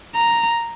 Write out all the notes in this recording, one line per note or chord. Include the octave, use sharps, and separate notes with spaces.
A#5